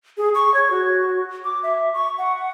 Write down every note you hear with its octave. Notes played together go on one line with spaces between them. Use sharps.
G#4
C#6
C#5
F#4
D6
E5
C#6
F#5